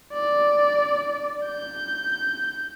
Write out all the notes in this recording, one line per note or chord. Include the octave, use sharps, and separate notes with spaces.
D5
G6